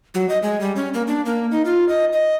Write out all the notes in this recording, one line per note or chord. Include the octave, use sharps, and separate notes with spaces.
F#3
D#5
G#3
G3
C#4
A#3
D4
A#3
D#4
F4
D#5
D#5